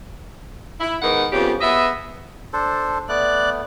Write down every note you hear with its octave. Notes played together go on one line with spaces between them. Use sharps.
E4
G#2 D#3 B3 A#4 F#5
F2 A#2 C#3 B3 G4
B3 G#4 D#5 E5
D4 A4 C5
A3 B3 D5 F#6